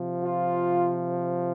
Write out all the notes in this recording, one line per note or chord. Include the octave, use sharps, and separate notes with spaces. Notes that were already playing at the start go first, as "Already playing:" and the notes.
Already playing: C3 F3
F4